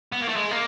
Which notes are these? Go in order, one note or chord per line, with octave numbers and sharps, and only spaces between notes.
B3
A#3
A3
G#3
A#3